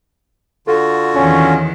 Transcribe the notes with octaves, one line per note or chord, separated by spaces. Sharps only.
D3 F4 F#4 A4
E2 D#3 E3 C#4